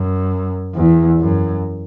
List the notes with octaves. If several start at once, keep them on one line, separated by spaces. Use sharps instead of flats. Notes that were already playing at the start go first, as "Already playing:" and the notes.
Already playing: F#2
E2
F#2